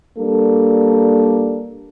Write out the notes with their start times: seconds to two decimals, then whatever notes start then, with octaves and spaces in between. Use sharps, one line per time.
0.17 G3 A#3 D4 A4